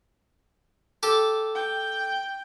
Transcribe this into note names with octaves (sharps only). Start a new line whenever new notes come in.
G4 A4
G5